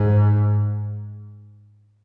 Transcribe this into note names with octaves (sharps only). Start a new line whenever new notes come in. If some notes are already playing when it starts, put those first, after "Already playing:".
Already playing: G#2